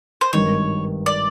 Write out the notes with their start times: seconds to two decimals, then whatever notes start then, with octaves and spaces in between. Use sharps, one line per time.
0.21 C5
0.33 G#1 G2 D#3 C#5
1.06 D5